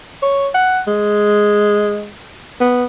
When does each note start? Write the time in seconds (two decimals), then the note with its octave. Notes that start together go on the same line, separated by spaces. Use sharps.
0.22 C#5
0.54 F#5
0.87 G#3
2.60 B3